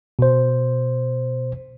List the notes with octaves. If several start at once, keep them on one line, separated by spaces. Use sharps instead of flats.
B2 C5